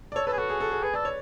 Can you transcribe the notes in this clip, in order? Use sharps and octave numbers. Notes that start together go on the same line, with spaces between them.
D5
A4 C#5
A4 B4
G#4
F#4 A4
G#4
A4
G#4
G#4 B4
A4 D5
C#5